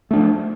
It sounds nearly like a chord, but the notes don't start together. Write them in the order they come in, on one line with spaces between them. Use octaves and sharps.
A3 D4 F3